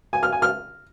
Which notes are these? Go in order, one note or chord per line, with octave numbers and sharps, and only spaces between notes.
G#5
F6
G#5
F6